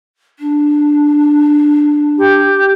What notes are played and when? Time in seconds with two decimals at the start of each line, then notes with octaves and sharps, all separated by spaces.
0.39 D4
2.18 G4